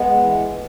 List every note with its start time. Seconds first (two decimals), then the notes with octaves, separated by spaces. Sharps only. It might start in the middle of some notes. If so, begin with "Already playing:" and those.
Already playing: G#3 B3
0.18 E3
0.49 A2